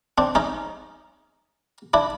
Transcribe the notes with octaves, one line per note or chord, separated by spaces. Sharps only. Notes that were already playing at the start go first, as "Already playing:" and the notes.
C4 D4
C#4 D#4
D4 E4